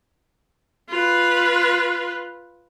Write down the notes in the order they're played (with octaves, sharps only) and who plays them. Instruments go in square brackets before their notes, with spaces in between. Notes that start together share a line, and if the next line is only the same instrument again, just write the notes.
[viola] F4 B4